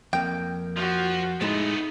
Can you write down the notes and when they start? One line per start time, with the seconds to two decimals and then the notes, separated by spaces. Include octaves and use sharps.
0.13 F2 A#3 G5
0.77 F3 F#4
1.41 A2 G#3 A3 B3 D#4